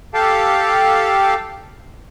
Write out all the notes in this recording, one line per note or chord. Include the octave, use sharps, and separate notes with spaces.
G4 A4 F5 G5 A5